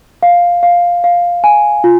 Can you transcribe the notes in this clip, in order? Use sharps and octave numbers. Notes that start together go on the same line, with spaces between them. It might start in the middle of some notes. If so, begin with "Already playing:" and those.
F5
F5
F5
G#5
F4